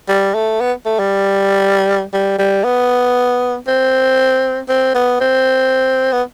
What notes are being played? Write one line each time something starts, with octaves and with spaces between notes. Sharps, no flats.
G3
A3
B3
A3
G3
G3
G3
B3
C4
C4
B3
C4
B3